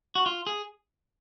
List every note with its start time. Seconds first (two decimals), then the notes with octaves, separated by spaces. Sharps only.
0.15 F#4
0.26 F4
0.47 G#4